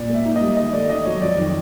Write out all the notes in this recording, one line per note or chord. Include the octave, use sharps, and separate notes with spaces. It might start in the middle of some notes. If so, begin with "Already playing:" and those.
Already playing: A#2 D5
A#3 E5
D#4
G3 D#5
D#3 D#5
A3 D5
D#3 D#5
F#3 C#5
F2 D5
D#3